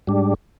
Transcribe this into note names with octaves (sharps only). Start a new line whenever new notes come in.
G#2 G3 D4